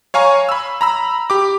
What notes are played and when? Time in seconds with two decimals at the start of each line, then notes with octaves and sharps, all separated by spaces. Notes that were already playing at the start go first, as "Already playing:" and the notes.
0.14 C#5 F5 G#5 A#5 C#6
0.49 B5 E6
0.81 A#5 B5 E6
1.30 G4 D6